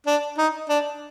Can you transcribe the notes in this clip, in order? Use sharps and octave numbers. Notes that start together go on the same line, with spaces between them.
D4
D#4
D4